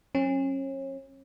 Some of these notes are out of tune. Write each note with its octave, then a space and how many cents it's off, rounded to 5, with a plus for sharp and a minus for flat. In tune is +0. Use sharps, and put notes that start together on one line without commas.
F#3 +0 C#4 -35